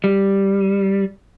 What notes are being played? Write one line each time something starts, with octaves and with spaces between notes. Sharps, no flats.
G3